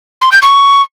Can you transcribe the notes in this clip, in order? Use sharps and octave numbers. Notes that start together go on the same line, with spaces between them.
C6
G6
C#6